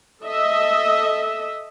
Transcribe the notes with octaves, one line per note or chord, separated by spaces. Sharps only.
A4 D#5 E5